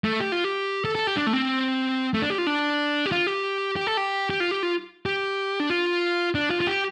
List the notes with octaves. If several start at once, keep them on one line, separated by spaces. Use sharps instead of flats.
A3
G4
F4
G4
A4
A4
G4
D4
A3
C4
A3
D4
G4
F4
D4
G4
F4
G4
G4
A4
G4
G4
F4
G4
F4
G4
D4
F4
D4
F4
F4
G4